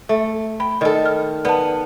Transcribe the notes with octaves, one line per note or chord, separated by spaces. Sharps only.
A3 E5
G5 B5
D#3 A4 D5 D#5
F6
B3 D5 A5